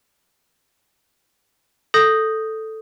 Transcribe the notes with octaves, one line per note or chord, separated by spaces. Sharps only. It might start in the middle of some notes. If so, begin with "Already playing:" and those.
A4 D#6 G6 A#6